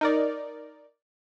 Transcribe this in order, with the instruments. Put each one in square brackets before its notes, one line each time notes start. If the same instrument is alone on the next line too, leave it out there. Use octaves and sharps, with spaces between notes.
[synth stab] D#4 A#4 D5